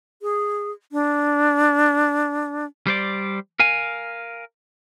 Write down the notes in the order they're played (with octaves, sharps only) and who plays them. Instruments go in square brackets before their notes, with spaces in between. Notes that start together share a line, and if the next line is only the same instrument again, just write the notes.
[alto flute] G#4
D4
[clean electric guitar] G3 C5 D5
A#4 F5 G#5